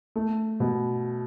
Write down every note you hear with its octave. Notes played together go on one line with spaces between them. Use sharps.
A3
B2